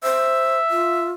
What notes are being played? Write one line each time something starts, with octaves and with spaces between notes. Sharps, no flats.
C5 E5
F4